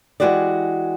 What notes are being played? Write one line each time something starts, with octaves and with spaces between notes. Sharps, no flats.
E3 F#3 G#3 F#4 G4 D5